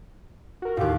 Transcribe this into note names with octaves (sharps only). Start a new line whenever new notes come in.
F#4 A#4
D#2 A2 F4 G4 F5